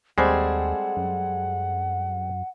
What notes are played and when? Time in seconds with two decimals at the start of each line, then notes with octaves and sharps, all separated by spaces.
0.18 D#2 G3 G#3 C4 G#4 A4 F#5
0.97 F#2